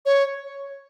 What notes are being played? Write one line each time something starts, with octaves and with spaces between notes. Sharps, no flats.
C#5